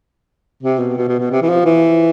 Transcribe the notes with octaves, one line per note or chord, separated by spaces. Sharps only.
C3
B2
B2
B2
B2
C3
E3
F3
E3